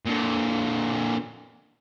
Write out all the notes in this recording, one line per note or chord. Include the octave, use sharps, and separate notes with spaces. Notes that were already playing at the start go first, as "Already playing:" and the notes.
A#2 D3